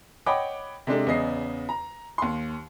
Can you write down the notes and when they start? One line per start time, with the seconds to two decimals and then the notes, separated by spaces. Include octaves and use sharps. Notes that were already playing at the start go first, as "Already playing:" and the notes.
0.26 C#5 D#5 F#5 G5 B5 D6
0.87 C3 G#3 D4 A4
1.07 E2 C#3 D#5 C7
1.69 A#5
2.18 D#2 C6